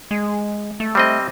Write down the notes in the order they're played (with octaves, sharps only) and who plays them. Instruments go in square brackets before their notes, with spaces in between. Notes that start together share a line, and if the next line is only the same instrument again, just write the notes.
[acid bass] G#3
A3
[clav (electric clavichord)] G3 C4 D#5